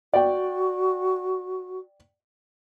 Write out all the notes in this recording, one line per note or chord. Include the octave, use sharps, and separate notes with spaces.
F#4 D5 G5